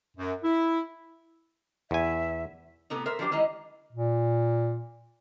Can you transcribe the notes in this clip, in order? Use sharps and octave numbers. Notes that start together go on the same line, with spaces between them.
F#2
E4
E2 E5 G#5
A2 C3 B3 A4 B4 A#5
A#4 C5 E5
F3 F#3 D4 D#4 G4 C5
D#3 G3 G#3 E4 D#5 A#5
A#2